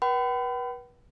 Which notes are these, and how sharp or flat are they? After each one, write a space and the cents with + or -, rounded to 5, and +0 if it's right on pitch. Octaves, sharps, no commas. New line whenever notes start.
B4 -30 G5 -45 B5 +35